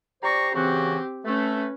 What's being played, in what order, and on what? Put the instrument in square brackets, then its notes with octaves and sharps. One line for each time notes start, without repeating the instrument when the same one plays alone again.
[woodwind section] G4 C5 A#5 [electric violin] D5 C#6
[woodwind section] C#3 E3 F#4 [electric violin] C4 G4
[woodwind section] A3 [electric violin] C#4 B4